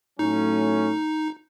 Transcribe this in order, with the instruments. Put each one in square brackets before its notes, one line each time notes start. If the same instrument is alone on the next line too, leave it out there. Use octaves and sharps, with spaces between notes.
[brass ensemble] A2 F#3 A3 C#4 [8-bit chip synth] D#4